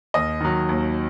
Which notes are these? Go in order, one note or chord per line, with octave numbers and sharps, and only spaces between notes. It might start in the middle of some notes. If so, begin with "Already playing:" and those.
D#2 D#5
D#3 F#3
D#2